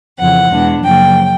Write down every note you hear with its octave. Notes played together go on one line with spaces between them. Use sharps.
F2 C#3 E3 F#5
E2 B2 G#3 B3 D4
F#2 C#3 F3 A#3 G5